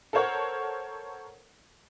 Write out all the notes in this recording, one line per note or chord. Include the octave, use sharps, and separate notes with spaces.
A4 A#4 C5 C#5 F#5 C#6